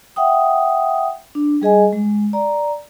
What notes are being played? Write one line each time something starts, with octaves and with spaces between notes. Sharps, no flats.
E5 F#5 G5 D#6
D4
G3 G#4 D#5 G#5
G#3
D5 A#5